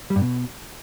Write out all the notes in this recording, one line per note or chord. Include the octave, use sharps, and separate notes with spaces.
G3
G2
B2